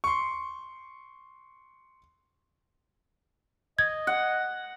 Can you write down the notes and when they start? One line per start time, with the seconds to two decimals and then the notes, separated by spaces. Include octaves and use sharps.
0.04 C6 C#6
3.79 D#5 G#6
4.07 F#5